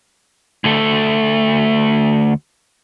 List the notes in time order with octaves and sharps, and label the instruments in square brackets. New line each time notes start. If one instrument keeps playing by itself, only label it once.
[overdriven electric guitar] D2 A3